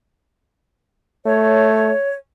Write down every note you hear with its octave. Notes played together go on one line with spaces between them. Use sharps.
A3 C#5